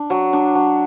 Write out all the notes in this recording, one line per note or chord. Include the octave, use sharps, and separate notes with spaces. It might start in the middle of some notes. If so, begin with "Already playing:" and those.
Already playing: D4
F#3
D4
F#3